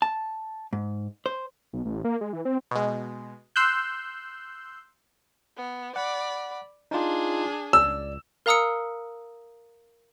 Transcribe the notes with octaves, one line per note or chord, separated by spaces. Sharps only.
A5
G#2
C5
B1
A1
A#3
G#3
E3
C4
B2 G#3
C6 E6 F#6 G6
B3
D5 F#5 B5
D4 D#4 F4 G#4
C#2 D5 E6
A#4 F5 A#5 D#6 E6 C#7